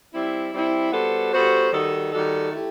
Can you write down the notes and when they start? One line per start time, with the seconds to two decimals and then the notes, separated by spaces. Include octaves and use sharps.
0.13 G3 C4 E4
0.53 G3 C4 E4
0.92 G3 B3 F#4 A4 C5
1.33 G3 B3 F#4 A4 C5
1.72 D#3 G3 D#4 F#4 A4
2.12 D#3 G3 D#4 F#4 A4
2.51 A3 E4 G4